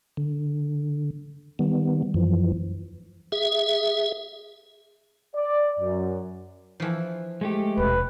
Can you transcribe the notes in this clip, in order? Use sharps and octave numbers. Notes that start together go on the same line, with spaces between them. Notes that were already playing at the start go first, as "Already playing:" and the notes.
D3
D#3 G3 B3
F#2 E3 F3
G#4 E5
D5
F#2
E3 F3
G#3 A3 G4
D#1 B2 B4